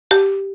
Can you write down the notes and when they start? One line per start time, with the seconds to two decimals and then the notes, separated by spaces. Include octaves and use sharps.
0.11 G4